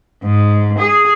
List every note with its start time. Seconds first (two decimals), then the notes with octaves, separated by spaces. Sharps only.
0.23 G#2
0.79 G#4